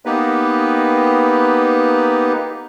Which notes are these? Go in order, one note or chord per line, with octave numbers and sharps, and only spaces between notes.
A#3 B3 D#4 G4 B4